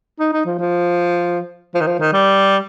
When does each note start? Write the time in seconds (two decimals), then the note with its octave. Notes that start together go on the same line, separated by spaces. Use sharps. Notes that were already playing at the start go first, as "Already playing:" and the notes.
0.19 D#4
0.33 D#4
0.46 F3
0.58 F3
1.74 F3
1.81 D#3
1.87 F3
1.99 D#3
2.13 G3